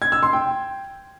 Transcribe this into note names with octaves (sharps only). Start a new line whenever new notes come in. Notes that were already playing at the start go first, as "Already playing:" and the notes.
G#6
E6
C6
G5